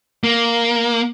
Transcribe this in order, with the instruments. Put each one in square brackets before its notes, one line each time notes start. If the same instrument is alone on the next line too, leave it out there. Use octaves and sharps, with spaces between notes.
[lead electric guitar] A#3